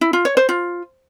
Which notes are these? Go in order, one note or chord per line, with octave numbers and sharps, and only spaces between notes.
E4
F4
C#5
C5
F4